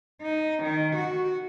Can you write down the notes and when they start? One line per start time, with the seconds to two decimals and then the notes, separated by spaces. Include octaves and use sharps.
0.21 D#4
0.64 D#3
0.96 F#4